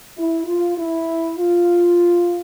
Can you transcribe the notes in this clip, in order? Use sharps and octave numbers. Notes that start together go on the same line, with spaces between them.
E4
F4
E4
F4